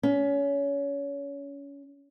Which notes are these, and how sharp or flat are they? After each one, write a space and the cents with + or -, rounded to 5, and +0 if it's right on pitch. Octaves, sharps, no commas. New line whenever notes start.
C#4 +25